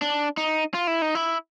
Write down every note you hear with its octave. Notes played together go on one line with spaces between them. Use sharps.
D4
D#4
F4
E4
D#4
E4